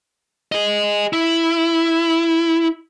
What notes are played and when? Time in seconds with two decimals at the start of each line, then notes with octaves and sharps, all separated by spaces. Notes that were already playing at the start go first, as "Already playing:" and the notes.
0.52 G#4 D#5
1.13 E4